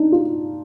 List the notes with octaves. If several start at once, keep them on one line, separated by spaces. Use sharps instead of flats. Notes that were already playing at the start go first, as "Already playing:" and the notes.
Already playing: D4 D#4
F4